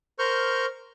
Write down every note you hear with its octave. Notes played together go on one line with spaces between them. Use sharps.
A#4 C5 C#6 F6 G6